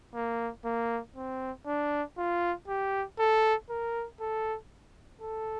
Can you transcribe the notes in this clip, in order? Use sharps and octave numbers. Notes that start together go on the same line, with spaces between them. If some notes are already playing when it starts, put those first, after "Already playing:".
A#3
A#3
C4
D4
F4
G4
A4
A#4
A4
A4